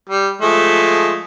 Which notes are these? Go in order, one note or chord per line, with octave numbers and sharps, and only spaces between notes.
G3
F3 G#3 A3